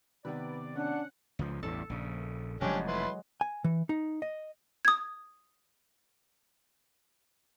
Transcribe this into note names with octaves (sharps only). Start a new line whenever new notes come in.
C3 D#3 B3 B4 D5
C#4 D4 F#5
C#2 F3
A1 E2 G2 A4
A#1 C#3
F1 F2 F#3 G#3 C#4 D4 G4
E4 B4 C6
G#5
E3
D#4
D#5
D#6 G#6